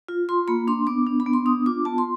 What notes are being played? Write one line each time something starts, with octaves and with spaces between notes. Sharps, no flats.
F4
F4 C6
A#3 B5
D4 C6
B3 D6
D4
B5
B3
C6
D4 D#6
F4 D6
B3 A5
C6